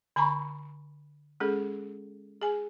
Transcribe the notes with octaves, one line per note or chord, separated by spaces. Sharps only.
D3 G#5 A#5 B5 C#6
G#3 C#4 G#4 A4
G#4 G#5